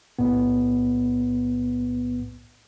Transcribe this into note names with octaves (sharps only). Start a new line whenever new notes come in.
B1 A2 B3